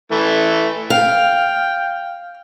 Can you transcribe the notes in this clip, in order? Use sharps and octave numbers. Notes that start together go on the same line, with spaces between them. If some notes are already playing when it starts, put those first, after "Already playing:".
E3 A3
F5 G5